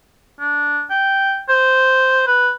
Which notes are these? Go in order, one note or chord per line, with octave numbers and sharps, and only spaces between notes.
D4
G5
C5
B4